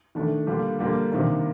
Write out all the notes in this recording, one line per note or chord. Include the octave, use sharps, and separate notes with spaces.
D#3 A3 D4
D3 G3 A#3 D4 F4
D3 G3 A#3 D4 F4
C3 D#3 A#3 D4